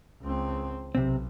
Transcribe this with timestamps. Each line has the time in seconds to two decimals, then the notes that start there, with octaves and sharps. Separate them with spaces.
0.23 C#2 C4
0.95 B1 C3 C4